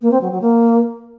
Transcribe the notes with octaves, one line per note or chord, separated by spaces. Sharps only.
A#3
C4
F#3
F#3
A#3